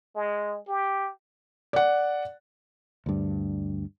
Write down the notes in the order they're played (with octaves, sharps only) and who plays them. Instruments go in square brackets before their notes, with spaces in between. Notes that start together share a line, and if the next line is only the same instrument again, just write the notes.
[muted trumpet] G#3
G4
[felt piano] D5 F#5
[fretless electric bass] D2 G2